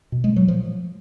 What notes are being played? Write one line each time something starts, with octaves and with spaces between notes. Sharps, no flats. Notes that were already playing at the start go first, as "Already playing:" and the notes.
B2
G#3
F#3
A#2 F3